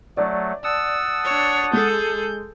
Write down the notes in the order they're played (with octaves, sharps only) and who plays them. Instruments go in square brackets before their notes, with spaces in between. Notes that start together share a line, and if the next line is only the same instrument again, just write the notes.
[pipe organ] F#3 A3 [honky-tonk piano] D5
[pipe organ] F#5 A5 D#6 [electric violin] E6
[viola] D4 C#5
[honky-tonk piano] G#3 [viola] G#4 A4 [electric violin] G6